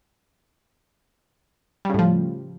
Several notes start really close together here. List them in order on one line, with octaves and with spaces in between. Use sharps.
G3 C#3 A2 F3